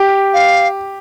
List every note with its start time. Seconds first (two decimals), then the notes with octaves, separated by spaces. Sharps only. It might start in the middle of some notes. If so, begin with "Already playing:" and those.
Already playing: G4
0.33 F5